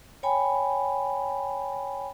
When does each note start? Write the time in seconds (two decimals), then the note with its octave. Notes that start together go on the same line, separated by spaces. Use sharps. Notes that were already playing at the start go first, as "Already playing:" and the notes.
0.23 C#5 G5 G#5 B5